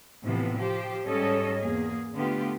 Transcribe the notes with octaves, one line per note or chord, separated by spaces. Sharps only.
A2 C3 E3 F3 B3
F3 G4 C5
G#2 G3 C#4 A4 C#5 D#5
E2 A#3 G#4
D3 A3 B3 F4 G4